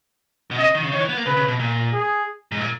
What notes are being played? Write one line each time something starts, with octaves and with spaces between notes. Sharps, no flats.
B2
C#3 D#5
D#3
C#3
D#3 C#5
E3
B3
A#3
C#3 B4
C#3
B2
A#2
G#4
G#2
A#2